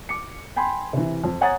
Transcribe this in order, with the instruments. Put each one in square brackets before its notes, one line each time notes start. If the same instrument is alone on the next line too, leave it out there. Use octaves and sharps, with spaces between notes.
[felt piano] D6 C#7
G5 G#5 B5 C6
C3 E3
F2
C#5 F#5 G#5 A#5 D#6 A6